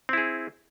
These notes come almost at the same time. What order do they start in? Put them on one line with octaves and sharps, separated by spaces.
C4 E4 G#4